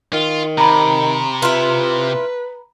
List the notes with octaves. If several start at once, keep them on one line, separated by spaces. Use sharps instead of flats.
D#3 F4
C3 A#5 B5
E4 F4 B4